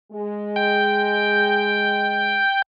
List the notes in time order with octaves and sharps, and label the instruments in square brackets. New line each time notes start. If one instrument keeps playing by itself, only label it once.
[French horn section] G#3
[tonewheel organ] G5